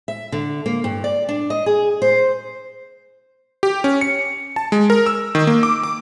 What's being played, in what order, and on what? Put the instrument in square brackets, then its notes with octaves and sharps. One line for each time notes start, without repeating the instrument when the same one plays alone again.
[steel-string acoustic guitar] E5
D3
A#3
G2
D5
D4
D#5
G#4
C5
[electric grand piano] G4
C#4
C#7
A5
G#3
A#4
E6
D#3
A#3
D6
D6